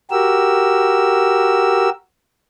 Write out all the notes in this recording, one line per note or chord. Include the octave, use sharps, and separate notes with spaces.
F#4 G4 A#4 E6